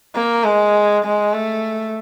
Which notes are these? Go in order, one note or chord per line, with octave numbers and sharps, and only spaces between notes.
A#3
G#3
G#3
A3